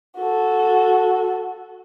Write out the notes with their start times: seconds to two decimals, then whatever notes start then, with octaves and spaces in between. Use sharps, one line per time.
0.17 F#4 A4